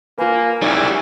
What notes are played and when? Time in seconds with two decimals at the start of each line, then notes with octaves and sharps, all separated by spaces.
0.18 A#3 F4 B4 G#5
0.62 F#1 G3 D#4 E4 G4 C#5